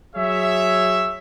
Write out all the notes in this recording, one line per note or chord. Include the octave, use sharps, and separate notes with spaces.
F#3 G#4 C#5 E5